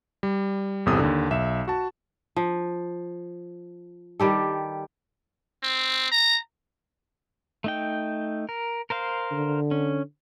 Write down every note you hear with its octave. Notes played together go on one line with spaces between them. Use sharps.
G3
G1 E2 C3 A4 D#6
D#2 D3
B1 E5 E7
F#4 A5
F3
D#3 G3 G4 A4
C4
A#5
A3 D#4 G5
A#4
A#4 C5 F5
D3
C#4